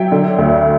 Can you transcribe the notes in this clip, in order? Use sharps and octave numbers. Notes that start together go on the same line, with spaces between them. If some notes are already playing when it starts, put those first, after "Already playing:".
Already playing: F#3 E5 G5
D3
D2